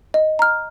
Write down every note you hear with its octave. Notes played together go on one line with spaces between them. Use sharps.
D#5
A#5 F6